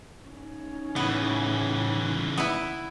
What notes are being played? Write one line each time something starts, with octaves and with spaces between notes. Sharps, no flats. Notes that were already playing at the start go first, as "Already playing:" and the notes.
C#4 D#4
A2 C#3 E3 B3
B3 E4